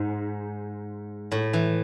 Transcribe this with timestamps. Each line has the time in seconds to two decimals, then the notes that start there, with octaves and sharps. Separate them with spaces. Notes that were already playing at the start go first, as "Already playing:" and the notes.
Already playing: G#2
1.32 A2
1.53 E3